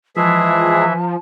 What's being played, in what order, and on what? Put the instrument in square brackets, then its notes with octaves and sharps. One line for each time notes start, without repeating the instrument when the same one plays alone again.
[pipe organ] E3 E5 [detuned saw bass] F3 [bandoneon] G#3 G#4 [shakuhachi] A5